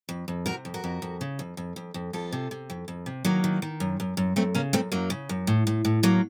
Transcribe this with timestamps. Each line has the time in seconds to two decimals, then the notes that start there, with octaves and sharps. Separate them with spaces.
0.09 F2
0.28 F2
0.46 C3 F#4 A#4
0.65 F2
0.74 F#4 A#4
0.84 F2
1.02 F2
1.21 C#3
1.39 F2
1.57 F2
1.76 F2
1.94 F2
2.13 F2 F4 A4
2.32 C3
2.51 C3
2.70 F2
2.88 F2
3.06 C3
3.25 D#3 F#3 A#3
3.44 D#3
3.62 D#3
3.80 F#2
4.00 F#2
4.17 F#2
4.36 F#2 A3 C4
4.54 C#3 A#3 C#4
4.73 F#2 A3 C4
4.92 F#2 F#3 A#3
5.10 C#3
5.29 F#2
5.47 A2
5.67 A2
5.85 A2
6.03 A2 F#3 A#3